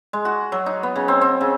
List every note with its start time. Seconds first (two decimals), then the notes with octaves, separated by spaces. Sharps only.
0.13 G#3
0.25 F#4
0.52 F#3
0.66 D#4
0.83 B3
0.96 C#3
1.08 C4
1.21 C4
1.41 C#3